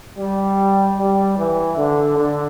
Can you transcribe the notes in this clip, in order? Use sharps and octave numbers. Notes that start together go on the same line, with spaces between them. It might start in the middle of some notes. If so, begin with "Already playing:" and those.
G3
G3
E3
D3
D3